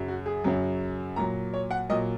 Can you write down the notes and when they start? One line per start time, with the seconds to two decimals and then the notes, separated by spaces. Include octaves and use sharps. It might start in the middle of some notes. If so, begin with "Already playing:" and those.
Already playing: F#2 C#3 F#3
0.08 F#4
0.26 G#4
0.44 F#2 C#3 F#3
1.16 A#2 F#3 A#5
1.54 C#5
1.71 F#5
1.89 A#2 F#3 D#5